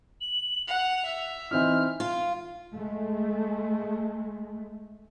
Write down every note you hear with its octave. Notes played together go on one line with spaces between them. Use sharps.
F#7
F#5 F7
E5
E3 C4 D#4 F6
F4
G#3 A3